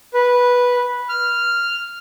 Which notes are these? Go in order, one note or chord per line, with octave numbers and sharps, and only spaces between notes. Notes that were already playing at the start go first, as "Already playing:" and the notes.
B4
F6